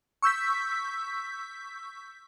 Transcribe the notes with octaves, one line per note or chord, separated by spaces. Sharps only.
C#6 E6 G6 B6